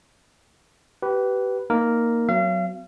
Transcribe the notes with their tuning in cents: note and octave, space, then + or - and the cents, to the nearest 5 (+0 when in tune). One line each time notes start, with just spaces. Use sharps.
G4 -30 B4 +0
A#3 +0 D#4 +0 A#4 +0
F#3 +0 B3 +40 F5 -40